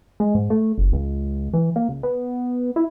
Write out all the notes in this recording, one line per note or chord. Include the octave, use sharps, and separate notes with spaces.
G#3
G#2
A3
F#1
C#2
E3
A#3
C#2
B3
E4